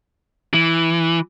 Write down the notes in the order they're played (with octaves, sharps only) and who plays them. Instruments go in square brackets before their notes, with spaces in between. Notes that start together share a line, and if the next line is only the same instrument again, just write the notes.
[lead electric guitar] E3